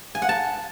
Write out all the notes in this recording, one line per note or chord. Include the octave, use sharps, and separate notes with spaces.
G#5
F#5
A5